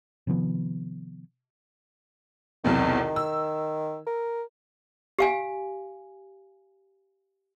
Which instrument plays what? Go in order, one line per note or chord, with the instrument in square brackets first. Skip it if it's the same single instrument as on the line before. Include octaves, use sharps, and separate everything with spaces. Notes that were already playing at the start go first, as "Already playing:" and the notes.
[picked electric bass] C3 D#3 F3 B3
[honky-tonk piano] B1 E2 C3 [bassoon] D#3
[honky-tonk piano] E6
[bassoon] A#4
[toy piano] G4 F5 G#5